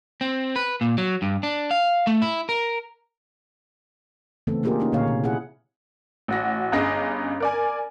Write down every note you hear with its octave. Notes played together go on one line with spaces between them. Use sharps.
C4
B4
A#2
F#3
G2
D4
F5
A3
E4
A#4
C#3 E3 A3 B3 C4 A4
A#3 D4 F4 G4 G#4 A#4
A#3 C#4 D#4
A#2 D3 A#3 C#5 F5
C3
E4 G#4 F#5
A1 F#4 A#6
G1 G2 C#4 G#4 D#5 A#6
A#4 D5 G#5